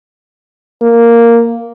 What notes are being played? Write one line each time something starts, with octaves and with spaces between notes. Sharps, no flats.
A#3